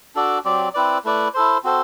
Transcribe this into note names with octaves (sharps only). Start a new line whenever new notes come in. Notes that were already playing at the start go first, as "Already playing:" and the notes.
D4 F#4 A4 D5
F#3 C4 G4 D5
C4 E4 B4 D5
A3 E4 B4 D5
E4 A4 C5
C4 F#4 A4 C5